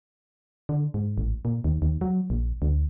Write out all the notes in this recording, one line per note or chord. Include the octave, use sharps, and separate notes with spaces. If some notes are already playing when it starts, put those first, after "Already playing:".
D3
G#2
A1
A#2
D#2
D#2
F#3
A#1
D2